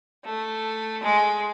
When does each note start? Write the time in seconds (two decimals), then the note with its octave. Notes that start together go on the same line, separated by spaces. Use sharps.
0.25 A3
1.03 G#3